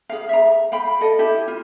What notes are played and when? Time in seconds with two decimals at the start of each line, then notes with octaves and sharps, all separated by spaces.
0.09 G#4 F5
0.29 E5 A#5
0.72 F5 G5 B5
1.01 A4 D#5
1.19 E4 G4
1.48 F4